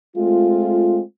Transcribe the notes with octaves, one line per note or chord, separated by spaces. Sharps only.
G#3 A3 C4 F4